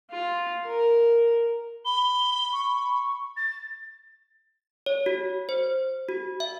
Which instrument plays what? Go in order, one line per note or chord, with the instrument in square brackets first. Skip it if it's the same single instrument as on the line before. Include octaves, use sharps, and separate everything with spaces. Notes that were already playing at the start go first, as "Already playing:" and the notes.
[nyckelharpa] F4
A#4
[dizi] B5 [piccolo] G7
[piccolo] C#6
A6
[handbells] C#5
F#4
C5
F#4
E5